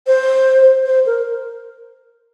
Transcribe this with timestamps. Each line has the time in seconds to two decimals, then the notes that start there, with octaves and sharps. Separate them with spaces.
0.07 C5
0.86 C5
1.06 A#4